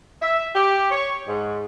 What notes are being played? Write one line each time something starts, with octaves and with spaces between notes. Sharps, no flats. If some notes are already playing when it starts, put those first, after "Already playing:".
E5
G4
C#5
G#2